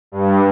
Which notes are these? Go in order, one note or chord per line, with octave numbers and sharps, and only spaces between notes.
G2